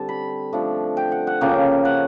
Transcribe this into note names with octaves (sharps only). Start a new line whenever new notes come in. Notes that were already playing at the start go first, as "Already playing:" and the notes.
Already playing: D3 G3 C4 A5
B5
F3 A3 D4
G5
F#5
F#5
C#3 F3 A#3 C#4 G5
F#5